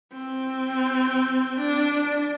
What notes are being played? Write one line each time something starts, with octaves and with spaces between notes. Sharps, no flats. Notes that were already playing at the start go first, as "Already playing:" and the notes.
C4
D4